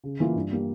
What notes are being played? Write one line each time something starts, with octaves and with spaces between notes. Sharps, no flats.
C#3
E3 A#3 F4
G2
G3 A#3